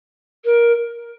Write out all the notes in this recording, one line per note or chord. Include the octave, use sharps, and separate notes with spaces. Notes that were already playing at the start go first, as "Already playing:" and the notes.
A#4